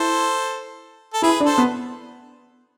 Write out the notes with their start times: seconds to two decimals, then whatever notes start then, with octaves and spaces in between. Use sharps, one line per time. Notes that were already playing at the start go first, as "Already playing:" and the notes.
Already playing: E4 A4 C5
1.14 A4
1.22 E4 G#4 B4
1.40 D4
1.45 A4 C5
1.58 B3